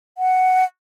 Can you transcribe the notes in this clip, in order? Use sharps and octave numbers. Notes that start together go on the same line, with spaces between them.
F#5